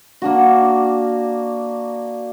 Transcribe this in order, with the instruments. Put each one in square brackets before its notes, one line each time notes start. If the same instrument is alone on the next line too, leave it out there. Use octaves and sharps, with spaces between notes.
[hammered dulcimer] A#3 D4 F#4